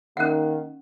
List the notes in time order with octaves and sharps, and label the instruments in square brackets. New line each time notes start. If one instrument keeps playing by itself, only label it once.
[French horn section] D#3 A#3 [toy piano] C#4 F#5